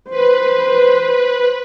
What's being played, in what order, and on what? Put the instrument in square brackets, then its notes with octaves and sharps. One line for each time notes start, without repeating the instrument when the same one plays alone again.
[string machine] B4 [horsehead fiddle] C5